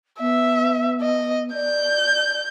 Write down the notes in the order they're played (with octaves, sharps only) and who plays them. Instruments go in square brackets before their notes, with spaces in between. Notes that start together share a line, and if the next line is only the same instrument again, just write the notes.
[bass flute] B3 [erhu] E5
[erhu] D#5
[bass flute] D5 [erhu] G6